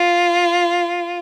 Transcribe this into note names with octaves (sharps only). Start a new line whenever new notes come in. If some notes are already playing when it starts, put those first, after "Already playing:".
Already playing: F4